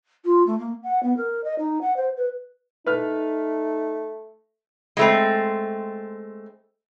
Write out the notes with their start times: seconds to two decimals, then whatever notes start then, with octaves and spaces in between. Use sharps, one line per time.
0.24 F4
0.46 A3
0.59 A#3
0.83 F#5
1.03 B3
1.17 A#4
1.44 D#5
1.58 D#4
1.81 F#5
1.96 C5
2.16 B4
2.86 A3 D#4 B4 F6
4.97 G#3 A3 C4